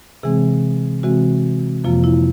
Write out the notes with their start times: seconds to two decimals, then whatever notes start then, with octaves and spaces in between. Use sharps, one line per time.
0.23 C3 E3 G#3 C4 G#4
1.03 C3 E3 G#3 C4 F#4
1.84 F2 C3 F3 A#3 F4
2.04 E4